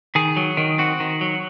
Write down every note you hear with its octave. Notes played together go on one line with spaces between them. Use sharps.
D#3 G#4
F#3
D#3
C4 F#4
D#3
F#3